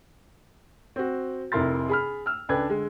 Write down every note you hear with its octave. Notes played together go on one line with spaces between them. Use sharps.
C4 F#4
F1 C3 E4 A#4 C6 A6
G#4 B5 F6
E6 F6
C#2 D4 A4 B4 G5 G#6
D3 G#3